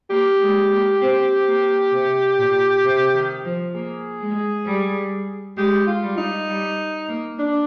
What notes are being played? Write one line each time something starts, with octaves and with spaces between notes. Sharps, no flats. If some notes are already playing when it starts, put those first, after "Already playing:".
A#3 G4
G#3
A#3
C4
A#3
C3
A#2
C3
D#3
F3
A#3 G#4
G#3
G3
G#3 G4
F4
G3
D#4
G3
A#3
D4